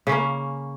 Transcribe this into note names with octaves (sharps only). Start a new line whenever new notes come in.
C#3 A#3 C#4